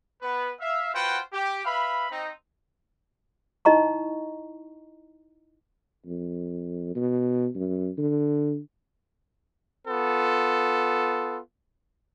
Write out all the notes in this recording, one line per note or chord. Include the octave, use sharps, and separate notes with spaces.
B3 B4
E5 F5
F4 F#4 B4 C5 F#5 G5
G4
B4 E5 F5 B5
C4 D#4
D#4 E4 D#5 A#5 C#6
F2
B2
F#2
D3
B3 F4 A4